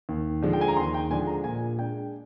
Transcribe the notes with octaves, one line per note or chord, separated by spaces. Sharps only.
D#2
D3 F3 G#3 D4
G5
G#5
A#5
D#2 C6
G5
D3 F3 G#3 D4 G#5
A#5
A#2 G#5
G#3 D4 G5